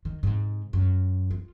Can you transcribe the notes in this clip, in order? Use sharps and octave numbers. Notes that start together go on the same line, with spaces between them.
D#3
G#2 C3
F#2
F4